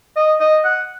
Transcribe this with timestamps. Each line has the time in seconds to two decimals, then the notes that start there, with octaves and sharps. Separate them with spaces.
0.17 D#5
0.40 D#5
0.65 F#5